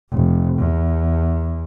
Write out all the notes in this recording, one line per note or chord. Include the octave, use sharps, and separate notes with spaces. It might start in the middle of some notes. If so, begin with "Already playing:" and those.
F1
E2